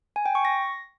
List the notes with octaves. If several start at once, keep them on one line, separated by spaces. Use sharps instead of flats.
G#5
G5
C#6
A#6